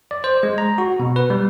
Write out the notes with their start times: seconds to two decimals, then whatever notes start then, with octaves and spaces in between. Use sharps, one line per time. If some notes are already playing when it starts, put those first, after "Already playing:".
0.11 D5
0.24 C5
0.43 G#3
0.58 A#5
0.78 F#4
1.00 B2
1.16 B4
1.30 G3